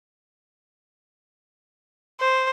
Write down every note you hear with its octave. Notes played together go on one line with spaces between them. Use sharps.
C5